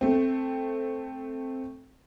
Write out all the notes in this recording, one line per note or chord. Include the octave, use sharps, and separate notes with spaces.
A3 C4